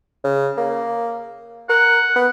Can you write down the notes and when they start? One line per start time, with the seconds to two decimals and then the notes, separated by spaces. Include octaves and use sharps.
0.24 C#3
0.57 A#3
1.69 A#4 F#5
2.16 B3